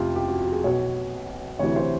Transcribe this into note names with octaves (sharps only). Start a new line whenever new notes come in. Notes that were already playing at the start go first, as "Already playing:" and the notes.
Already playing: F1 F2 C3 F4 G4
G4
F#4
F#4
G#4
B1 B2 C#5
D2 C3 E3 C#5
C5